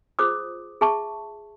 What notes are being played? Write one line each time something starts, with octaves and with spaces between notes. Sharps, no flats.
F4 G#4 C5 D6 D#6
G#4 E5 A5 C#6